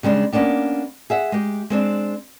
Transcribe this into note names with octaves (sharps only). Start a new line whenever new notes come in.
C#3 G3 G#3 D4
A#3 B3 C#4 D4 G4
G#4 E5 F#5
G#3 G4
G#3 C4 D4